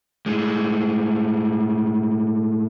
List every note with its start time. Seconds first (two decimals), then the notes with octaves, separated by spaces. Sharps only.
0.26 A2 G#3